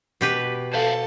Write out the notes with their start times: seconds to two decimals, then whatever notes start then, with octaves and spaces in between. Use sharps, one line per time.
0.21 B2 G4 B4
0.74 A4 C5 E5 F5